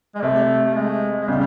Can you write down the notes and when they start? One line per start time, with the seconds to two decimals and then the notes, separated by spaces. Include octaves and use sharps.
0.15 G#3
0.22 C3 A3
0.66 A3
0.76 G#3
1.21 G#3
1.28 C#3 G3